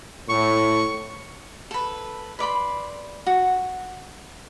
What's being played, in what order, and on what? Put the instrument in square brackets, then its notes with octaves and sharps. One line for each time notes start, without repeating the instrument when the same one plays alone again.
[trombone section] A2 [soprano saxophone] C#6
[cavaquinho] A4 B4
B4 D5 B5 C6
F#4